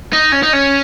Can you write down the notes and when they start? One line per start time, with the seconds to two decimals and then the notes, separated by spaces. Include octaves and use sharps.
0.13 D#4
0.32 C#4
0.43 D#4
0.53 C#4